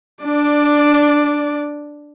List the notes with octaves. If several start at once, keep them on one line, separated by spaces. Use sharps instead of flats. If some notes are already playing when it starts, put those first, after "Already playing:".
D4 D5